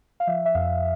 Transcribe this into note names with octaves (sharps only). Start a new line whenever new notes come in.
F5
F3 E5
E5
F2 F5